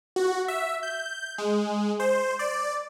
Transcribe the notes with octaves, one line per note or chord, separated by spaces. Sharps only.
F#4
E5
G6
G#3
C5
D5